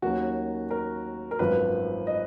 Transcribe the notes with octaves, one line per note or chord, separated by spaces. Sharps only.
D#2 D#3 F#3 A#3 C#4 F#4
A#4
A#4
G#1 F#2 F3 B4
D#5